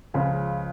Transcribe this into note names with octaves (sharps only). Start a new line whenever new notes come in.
C#2 C#3 F3